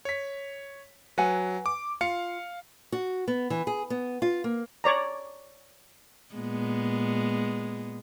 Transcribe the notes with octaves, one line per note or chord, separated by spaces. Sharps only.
C#5 B6
F#3 B4 F#5 G#5
D6
F4 F5 C#7
F#4
B3
E3
G#4
B3
F4
A#3
C#5 D5 A#5
A#2 G#3 B3